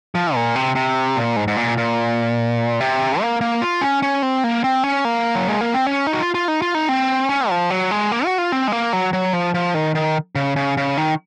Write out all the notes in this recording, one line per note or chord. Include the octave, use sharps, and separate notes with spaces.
F3
A#2
C3
C3
A#2
G#2
G#2
A#2
A#2
C3
A#3
A#3
F4
C#4
C#4
C4
A#3
C4
C#4
A#3
F#3
G#3
A#3
C4
C#4
D#4
F#4
F4
F4
D#4
F4
D#4
C4
C#4
F3
F#3
G#3
A#3
F#4
F4
C4
G#3
A#3
F#3
F#3
F3
F3
D#3
D#3
C#3
C#3
C#3
D#3